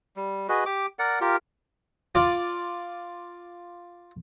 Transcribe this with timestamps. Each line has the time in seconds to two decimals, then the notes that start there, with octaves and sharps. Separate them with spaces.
0.16 G3
0.49 F#4 G#4 B4 D#5
0.66 G4 D6
0.99 A#4 D5 F#5
1.21 F4 G4 A#4
2.15 F4 D5